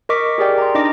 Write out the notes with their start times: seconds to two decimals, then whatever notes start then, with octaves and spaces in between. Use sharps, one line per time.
0.09 A#4 D#5 C#6 D6 B6
0.38 G4 G#4 A#4 D5 G5
0.58 A#5 C6
0.75 D4 D#4 D#5 A#5 D6 A#6